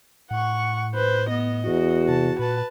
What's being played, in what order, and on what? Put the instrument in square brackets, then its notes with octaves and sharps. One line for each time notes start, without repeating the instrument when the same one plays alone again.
[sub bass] A2 [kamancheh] F#5 C#6
[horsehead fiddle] B4 [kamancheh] C5
[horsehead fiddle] B3 [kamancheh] D#5
[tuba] E2 [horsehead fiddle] F#4
[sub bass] C3 [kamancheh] A5
[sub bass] A#2 [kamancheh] B4 A5